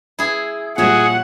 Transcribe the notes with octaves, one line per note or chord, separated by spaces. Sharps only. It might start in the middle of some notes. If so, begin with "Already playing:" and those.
E4 G#4
A#2 G3 F#4 G#4 C#5 E5 F#5